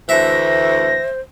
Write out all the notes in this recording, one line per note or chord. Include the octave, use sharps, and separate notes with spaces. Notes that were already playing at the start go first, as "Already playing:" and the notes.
D2 E3 C5 E5 A#6